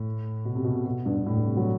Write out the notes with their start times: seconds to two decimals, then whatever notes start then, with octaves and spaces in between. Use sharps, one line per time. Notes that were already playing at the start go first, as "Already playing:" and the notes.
Already playing: A2
0.45 B2
0.55 C3
0.64 B2
0.86 B2
1.05 G2
1.16 G2
1.26 A2
1.36 G2
1.46 C3
1.57 F#3